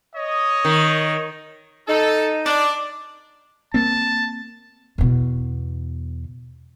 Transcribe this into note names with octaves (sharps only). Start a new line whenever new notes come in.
C#5 D#5
D#3
D#4 A4
D4 D5
A#3 C4 A5
E2 B2